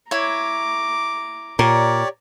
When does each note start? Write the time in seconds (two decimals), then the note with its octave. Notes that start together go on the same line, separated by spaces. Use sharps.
0.11 E4 C#5 A#5 D6
1.59 A#2 G4 A#4 C#5 D5